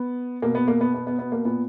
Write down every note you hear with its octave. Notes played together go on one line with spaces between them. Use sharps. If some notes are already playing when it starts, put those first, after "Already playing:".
Already playing: B3
B2 A#3
B3
A#3
B3
B3
B3
B3
A#3
A#2 B3